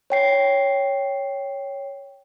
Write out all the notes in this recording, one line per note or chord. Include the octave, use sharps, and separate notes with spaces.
C#5 G5 C7